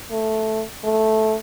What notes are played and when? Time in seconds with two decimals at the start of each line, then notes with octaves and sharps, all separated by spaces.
0.11 A3
0.84 A3